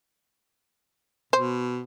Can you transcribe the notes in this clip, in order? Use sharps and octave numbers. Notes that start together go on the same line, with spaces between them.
B2 C5